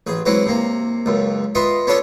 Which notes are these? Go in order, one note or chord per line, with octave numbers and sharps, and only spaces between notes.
A1 G#4
E3 F#3 G#3 C4 F#4
C3 A#3
C#2 F#2
B3 F4 D#5 E5 C6
B3 C#4 D4 F4 A4 C#5